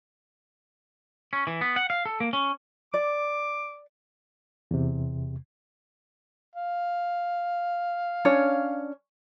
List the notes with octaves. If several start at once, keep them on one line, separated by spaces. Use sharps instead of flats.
C#4
E3
B3
F#5
F5
A4
A#3
C#4
D5 D6
E2 C3
F5
C#4 D4 C#5